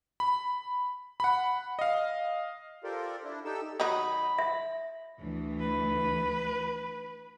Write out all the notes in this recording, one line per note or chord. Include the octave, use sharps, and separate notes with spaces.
B5
F#5 B5
D#5 F5
F4 G4 A4 A#4 C5 D5
D4 E4
D#4 G4 A4 E6
D#3 F#3 D#4 B5
E5
D2 E3
B4